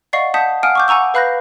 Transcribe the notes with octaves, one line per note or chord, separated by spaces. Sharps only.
D5 D#5 F5 F#5 C#6 C7
F#5 A5 D#6 G6 B6
F5 F#5 G#5 D#6 F6 D7
C#6 D6 G6
F#5 G#5 A#5 C#6 E6
B4 F5 B5 F#6 G6 A#6